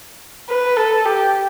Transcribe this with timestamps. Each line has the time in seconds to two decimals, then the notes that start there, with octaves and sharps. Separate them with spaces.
0.49 B4
0.76 A4
1.05 G4